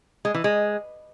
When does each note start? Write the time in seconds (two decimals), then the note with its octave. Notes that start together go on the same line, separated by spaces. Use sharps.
0.25 G#3
0.34 E3
0.44 G#3